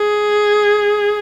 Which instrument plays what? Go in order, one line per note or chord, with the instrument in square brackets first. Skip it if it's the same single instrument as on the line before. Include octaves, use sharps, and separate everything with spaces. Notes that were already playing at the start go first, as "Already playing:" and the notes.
Already playing: [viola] G#4